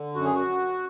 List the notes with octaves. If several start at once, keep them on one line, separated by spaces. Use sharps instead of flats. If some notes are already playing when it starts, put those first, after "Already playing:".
Already playing: D3
F#2 F#4
G#4
F#4